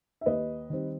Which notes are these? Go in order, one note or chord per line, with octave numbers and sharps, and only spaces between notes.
E5
D#2 B4 D#5
D#3 G3 C4